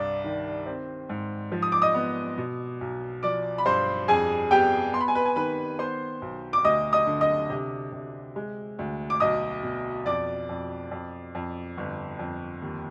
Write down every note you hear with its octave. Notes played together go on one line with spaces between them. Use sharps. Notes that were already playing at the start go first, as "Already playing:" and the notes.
Already playing: C2 G2 D5
D#3
C4
G#2
F3
D#6
D6
D#5 D#6
B3
B2
B1
F3 D5 D6
B5
G2 C5 C6
F2 G#4 G#5
B3 G4 G5
B3 C6
B5
G#5
B4 B5
G#5
D#3 B4 B5
B3 C5 C6
B1
D6
D2 D#5 D#6
D#5 D#6
D3
D#5 D#6
C3
C3
G#3
D2
D6
B1 D#5 D#6
B2
F2 D5 D6
F2
F2
F2
G1
F2
D#2